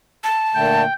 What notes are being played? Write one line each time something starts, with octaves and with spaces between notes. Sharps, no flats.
A5
A#2 D3 A3 G5